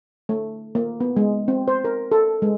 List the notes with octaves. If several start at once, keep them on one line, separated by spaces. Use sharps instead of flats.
A3
A#3
B3
G#3
C4
C5
A#4
A4
G#3